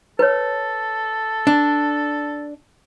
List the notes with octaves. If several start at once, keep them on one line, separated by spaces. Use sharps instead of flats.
A4 B4 C#5
D4